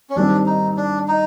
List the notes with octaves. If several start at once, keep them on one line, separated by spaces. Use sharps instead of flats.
C#4
D#3 G3 C4 D4
D#4
D4
D#4